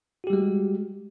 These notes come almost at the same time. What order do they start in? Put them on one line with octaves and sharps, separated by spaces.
F#4 G4 G3 G#3